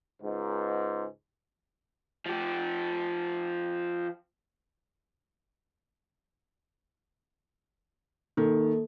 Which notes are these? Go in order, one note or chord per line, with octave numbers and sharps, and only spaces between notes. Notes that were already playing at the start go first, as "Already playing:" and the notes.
C#2 G#2
F3 G4
D#3 A#3 A4